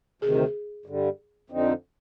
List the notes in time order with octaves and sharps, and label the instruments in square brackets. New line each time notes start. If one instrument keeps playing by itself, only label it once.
[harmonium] D2 C3 D#3 [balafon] G#4
[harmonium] G2 D3 G3
F2 D3 F3 C4 D#4